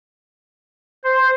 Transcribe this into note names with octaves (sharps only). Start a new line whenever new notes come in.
C5